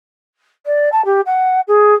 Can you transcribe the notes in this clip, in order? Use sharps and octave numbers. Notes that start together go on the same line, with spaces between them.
D5
A5
G4
F#5
G#4